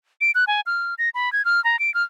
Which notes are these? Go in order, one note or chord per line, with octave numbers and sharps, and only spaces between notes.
D7
F#6
G#5
F6
A#6
B5
G#6
F6
A#5
D7
F6